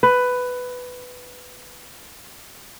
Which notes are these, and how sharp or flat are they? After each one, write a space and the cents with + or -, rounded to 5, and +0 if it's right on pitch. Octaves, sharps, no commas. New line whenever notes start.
B4 +10